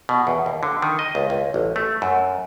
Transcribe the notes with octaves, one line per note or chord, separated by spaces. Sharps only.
B2
E2
D#2
D3
D#3
D#5
C#2
C#2
A1
A3
F#2